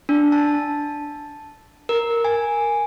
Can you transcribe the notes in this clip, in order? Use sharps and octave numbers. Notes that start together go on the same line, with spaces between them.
D4
A5
A#4
G#5